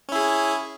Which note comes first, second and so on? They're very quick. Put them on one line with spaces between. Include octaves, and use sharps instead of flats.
C#4 E4 G#4